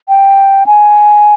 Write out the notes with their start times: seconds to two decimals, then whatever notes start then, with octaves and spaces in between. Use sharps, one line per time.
0.08 G5
0.67 G#5